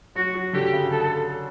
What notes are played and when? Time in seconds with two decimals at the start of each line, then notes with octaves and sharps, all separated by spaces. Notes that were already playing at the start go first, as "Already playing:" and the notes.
0.16 F#3 F#4
0.34 F#3
0.53 D3 G4
0.73 C#3
0.92 A4